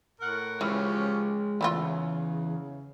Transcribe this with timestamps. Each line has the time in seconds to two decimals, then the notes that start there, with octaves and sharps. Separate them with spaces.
0.21 A2 A#4 F#5
0.61 E3 F3 G#3 C#4 G4 C#5
1.61 E2 C#3 A3 E4 F4